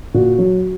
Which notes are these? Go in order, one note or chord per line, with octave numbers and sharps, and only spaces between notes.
A#2 F#4
F#3